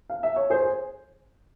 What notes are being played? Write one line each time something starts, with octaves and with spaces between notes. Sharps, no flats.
F5
E5
C#5
G#4 C5
C5